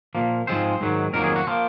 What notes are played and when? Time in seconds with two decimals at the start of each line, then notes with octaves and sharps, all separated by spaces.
0.15 A#2 F3 A#3
0.47 G#2 F3 G#3 C4 C5
0.81 G#2 D#3 F#3
1.13 F2 D#3 F#3 A#3 A#4
1.24 G#4
1.36 F#4
1.47 F3 A#3 C4